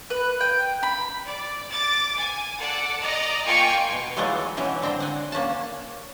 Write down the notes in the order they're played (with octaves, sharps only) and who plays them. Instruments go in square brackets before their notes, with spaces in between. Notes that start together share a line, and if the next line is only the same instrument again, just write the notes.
[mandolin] B4
G5
B5
[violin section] D5
D6 A6
G#5
A4 D5 F#5
D5 D#5 A#5
A#3 F4 G5 G#5 C#6 C#7
[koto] B2 G#5
E3 F#3 G#3 A3 D#4 F4
B2 E3 F#3 C#4 C#5
D3 C4 G5 A#5
F#5 G#5
A#3 C#4 F#5 A5